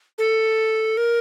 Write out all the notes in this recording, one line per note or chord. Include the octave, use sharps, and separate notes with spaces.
A4
A#4